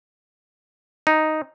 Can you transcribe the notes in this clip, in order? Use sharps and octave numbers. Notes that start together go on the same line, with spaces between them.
D#4